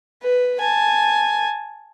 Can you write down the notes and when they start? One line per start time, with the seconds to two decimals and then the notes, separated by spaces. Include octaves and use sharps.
0.22 B4
0.60 G#5 A5